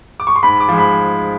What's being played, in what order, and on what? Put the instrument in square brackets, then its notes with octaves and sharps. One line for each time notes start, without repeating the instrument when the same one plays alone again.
[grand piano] D6
C#6
C6
G#2 B5
D6
F3 G#3
B5